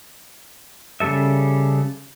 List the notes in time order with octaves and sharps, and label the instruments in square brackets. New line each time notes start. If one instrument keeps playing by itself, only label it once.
[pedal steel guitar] C#3 F3 G3 A4 E5